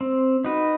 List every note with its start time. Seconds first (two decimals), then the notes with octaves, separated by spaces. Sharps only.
0.01 C4
0.45 D#4 F#4 B4